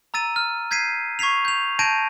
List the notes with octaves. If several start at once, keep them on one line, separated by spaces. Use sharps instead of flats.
A#5 E6 A6 D#7
F6
G6 G#6 B6 C7 D#7
C#6 G#6 B6 C7 F7
G6 F7
A5 G6 G#6 A#6 D7 D#7